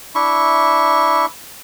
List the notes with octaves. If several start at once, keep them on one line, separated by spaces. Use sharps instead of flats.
D4 E4 E5 C#6